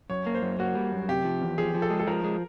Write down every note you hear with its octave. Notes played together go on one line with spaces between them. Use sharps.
F#2 C#5
A#3
C5
F#2
A#3 F#4
G3
F#2
C3 G4
F3
E2
F3 G#4
F3
A4
G#3
A4
F3 A#4
G#3